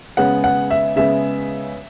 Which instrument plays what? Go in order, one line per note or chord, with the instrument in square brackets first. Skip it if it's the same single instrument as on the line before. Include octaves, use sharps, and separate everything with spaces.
[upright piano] C#3 G#3 B3 F#5
F#5
E5
C#3 G#3 B3 E5